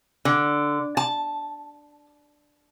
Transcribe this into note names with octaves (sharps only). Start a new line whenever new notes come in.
D3
A5